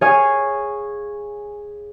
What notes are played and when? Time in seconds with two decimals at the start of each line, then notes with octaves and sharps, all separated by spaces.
0.01 G#4 C#5 F5 G#5